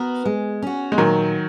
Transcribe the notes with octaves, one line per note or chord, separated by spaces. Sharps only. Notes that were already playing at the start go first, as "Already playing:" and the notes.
Already playing: B3 F#4 A#4
G#3
C#4 F#4
G#3
A#2 D#3 F#3